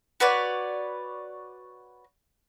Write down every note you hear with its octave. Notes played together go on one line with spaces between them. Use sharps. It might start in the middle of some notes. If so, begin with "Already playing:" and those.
F#4 B4 C#5 D5